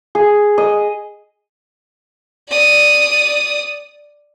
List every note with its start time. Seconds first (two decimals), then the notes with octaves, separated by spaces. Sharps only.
0.15 G#4
0.58 D#5
2.49 D5 D#6